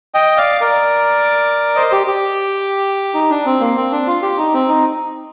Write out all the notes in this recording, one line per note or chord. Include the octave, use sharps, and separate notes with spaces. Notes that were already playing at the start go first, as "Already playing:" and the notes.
D#5 G5
D5 F5
A#4 D5
C5 D#5
G4
G4
D#4
D4
C4
A#3
C4
D4
F4
G4
D#4
C4
D#4